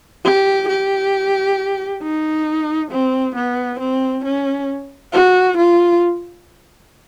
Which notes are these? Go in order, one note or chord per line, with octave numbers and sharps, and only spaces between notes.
G4
G4
D#4
C4
B3
C4
C#4
F#4
F4